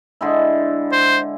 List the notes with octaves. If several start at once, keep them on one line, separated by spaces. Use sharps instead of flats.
D3 G#3 E4
C5